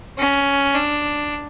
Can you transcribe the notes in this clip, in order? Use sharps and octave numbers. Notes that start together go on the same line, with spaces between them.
C#4
D4